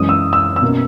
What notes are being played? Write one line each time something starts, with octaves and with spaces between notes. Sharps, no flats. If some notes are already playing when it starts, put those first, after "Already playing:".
Already playing: F#2 E3 G#3 C#4 D#6
E6
E6
E6
B2 A#3 C#4